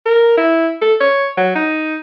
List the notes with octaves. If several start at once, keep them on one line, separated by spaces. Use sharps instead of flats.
A#4
E4
A4
C#5
F#3
D#4